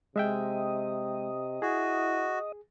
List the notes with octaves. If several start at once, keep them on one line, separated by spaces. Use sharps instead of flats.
C3 G#3 D#5 E5 G5
E4 F#4 G#4